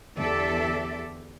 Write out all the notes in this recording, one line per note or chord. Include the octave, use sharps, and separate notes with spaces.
E2 D3 G4 A4 D5 E5